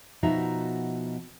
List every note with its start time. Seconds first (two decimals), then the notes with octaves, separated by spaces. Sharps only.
0.23 B2 F3 D#4 F#4 E5 A#5